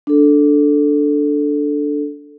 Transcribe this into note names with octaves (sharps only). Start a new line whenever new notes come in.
D4 A4